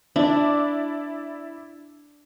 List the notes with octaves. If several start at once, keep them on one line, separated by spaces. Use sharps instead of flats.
D4 E4 D5